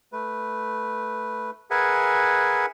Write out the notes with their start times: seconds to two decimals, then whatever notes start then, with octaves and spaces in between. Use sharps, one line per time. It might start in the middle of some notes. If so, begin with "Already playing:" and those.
0.12 A3 B4
1.70 G#4 A#4 B4 E5 F#5 G#5